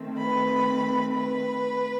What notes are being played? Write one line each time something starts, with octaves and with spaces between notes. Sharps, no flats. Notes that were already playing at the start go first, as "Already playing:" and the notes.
Already playing: D#3 A3 C4
B4 B5
B4 B5